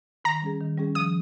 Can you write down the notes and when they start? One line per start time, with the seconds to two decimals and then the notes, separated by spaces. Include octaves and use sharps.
0.25 D#3 A#5
0.42 G3 C#4 G#4
0.60 D#3
0.78 G3 C#4 G#4
0.95 F3 D#6